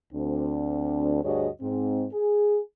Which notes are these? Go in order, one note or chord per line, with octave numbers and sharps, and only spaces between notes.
D2 C4 D4
D2 G2 F#4 G#4 C#5 D#5
G#2 C4
G#4